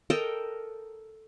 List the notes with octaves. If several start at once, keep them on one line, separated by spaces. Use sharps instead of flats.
A4 A#4 D#5 G5